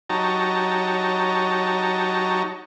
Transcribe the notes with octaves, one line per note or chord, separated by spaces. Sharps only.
F#3 D#4 G4 C#5 A5 A#5